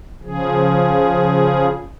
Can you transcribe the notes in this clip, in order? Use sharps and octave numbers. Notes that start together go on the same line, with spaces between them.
C#3 F3 G#4